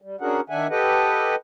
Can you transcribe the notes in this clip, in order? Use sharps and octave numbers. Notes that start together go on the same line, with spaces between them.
G3
C#4 D4 F#4 G#4 A#4 F#5
D#3 D4 E5 F#5 G#5
G4 A4 B4 D#5 F#5